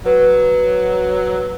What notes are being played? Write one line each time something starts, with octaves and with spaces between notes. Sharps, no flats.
F#3 B4